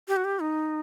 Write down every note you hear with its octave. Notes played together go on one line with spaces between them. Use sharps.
G4
F#4
G4
D#4